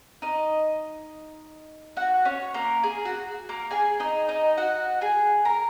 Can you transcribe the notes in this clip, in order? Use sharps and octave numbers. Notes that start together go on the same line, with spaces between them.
D#4 D#5
F#4 F#5
C#4 C#5
A#3 A#4
G#4
F#4
A#3 A#4
G#4 G#5
D#4 D#5
D#4 D#5
F#4 F#5
G#4 G#5
A#4 A#5